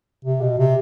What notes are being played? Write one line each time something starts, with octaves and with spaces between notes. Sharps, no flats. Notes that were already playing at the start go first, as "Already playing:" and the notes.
C3
B2
C3